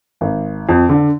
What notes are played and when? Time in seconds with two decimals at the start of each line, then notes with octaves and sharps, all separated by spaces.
0.21 G#1
0.69 F2
0.89 D3